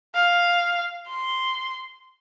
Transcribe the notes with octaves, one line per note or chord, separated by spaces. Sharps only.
F5
C6